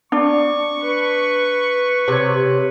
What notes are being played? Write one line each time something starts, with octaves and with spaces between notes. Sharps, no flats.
D4 C#6
B4
C3 C#5